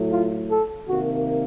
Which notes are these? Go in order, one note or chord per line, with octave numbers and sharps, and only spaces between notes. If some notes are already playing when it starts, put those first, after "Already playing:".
Already playing: A2 F#3 A3
F4
A4
C3 D#3 A#3 F#4